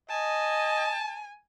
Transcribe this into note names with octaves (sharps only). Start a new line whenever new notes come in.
D#5 G#5 A5